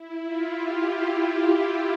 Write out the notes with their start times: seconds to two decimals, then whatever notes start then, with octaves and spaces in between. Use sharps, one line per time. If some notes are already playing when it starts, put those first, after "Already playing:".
Already playing: E4
0.25 F4
0.56 G4
0.87 E4